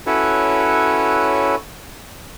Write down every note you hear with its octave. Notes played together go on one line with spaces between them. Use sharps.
C#4 E4 F#4 A4 B4 C#5